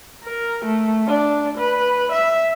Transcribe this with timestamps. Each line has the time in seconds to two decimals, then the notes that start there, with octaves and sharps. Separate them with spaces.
0.24 A#4
0.65 A3
1.07 D4
1.58 B4
2.12 E5